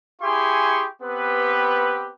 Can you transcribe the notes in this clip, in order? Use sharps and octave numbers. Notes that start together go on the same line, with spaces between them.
E4 G4 G#4 G#5 C6 C#6
B3 C4 G4 B4